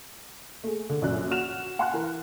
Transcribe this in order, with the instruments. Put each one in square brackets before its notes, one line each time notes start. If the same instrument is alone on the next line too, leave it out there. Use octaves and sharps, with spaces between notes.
[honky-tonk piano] A3 G#4
D3
A#1 F#2 D5 F#6
F#4 F6 F#6 E7 F7
F#5 G#5 A5 C6 F6 F#6
E3 A#4